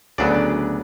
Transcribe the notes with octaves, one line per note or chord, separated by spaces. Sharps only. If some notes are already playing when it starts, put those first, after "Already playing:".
D2 C#3 F#3 B3 D4 D5